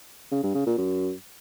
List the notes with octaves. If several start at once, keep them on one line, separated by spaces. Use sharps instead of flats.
C#3
G2
C#3
A#2
F#2